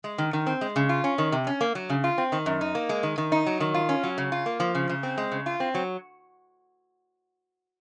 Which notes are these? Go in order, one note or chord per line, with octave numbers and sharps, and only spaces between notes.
G#3
D#3
D#3
C4
G#3
C#3
F4
C#4
D#3
C3
C#4
A#3
F#3
C#3
F4
C4
D#3
F#2
D#4
A#3
G#3
D#3
D#3
D#4
F#3
D#3
F4
C#4
F#3
C#3
F4
A#3
F3
C#3
C#3
C4
G#3
C#3
F4
C4
F#3